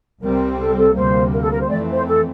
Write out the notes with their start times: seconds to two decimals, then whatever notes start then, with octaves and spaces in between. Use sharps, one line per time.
0.21 C2 C3 G3 C4 A#4
0.58 A4
0.77 A4
0.95 D2 C3 G3 A#3 C5
1.31 A#4
1.42 A4
1.51 A#4
1.60 C5
1.69 F2 E3 A3 C4 D5
1.92 C5
2.06 A4